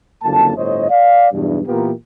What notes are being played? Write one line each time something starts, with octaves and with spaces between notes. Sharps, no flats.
F#1 F2 D3 A#3 A5
G1 A2 C5 C#5 D#5
D5 F5
B1 E2 G2
A#2 E3 B3 F4 G4 A#4